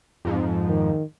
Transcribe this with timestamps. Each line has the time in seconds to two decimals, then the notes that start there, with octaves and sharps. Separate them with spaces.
0.25 F2 G#2 F3
0.69 D#3